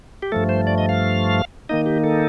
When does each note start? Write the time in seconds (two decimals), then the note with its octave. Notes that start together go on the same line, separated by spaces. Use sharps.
0.22 G4
0.32 G2 F3 A3 A4
0.49 C5
0.67 D5
0.78 D#5
0.89 F5
1.69 D#3 A#3 D#4 D#5
1.86 G4
2.04 A4